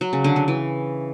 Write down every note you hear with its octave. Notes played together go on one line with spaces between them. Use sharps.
F#3
C#3
D3
C#3
E3